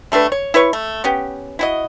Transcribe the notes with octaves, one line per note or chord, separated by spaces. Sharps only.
G3 A3 D4 B4
C#5
E4 B4 C#5 C#6
A3
B3 C#4 G4
E4 F#4 D#5